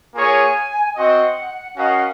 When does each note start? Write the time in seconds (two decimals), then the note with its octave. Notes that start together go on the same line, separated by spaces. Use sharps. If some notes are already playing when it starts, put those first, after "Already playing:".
0.14 A#3 F4 G#4 C#5 G#5
0.95 C4 F#4 C5 D#5 F#5
1.77 C#4 F#4 A#4 D#5 F5 F#5